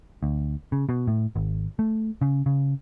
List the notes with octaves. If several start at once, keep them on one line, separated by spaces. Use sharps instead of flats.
D2
C#3
B2
A2
G#1
A3
C#3
C#3